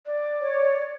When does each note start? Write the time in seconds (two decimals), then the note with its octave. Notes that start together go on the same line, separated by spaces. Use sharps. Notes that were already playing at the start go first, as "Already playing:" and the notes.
0.06 D5
0.40 C#5